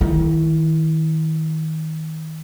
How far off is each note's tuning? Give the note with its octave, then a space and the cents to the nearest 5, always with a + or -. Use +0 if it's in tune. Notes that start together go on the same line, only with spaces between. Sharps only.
D#3 +30 E4 +0